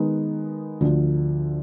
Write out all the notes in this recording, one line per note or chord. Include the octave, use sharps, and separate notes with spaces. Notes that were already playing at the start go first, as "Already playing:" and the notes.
Already playing: D#3 G#3 B3 D#4
D2 D3 F3